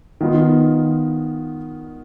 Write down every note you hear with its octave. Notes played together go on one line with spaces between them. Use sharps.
D#3 B3 F4